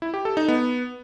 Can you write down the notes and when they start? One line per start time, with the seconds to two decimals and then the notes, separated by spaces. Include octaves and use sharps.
0.02 E4
0.14 G4
0.25 A4
0.37 D#4
0.48 B3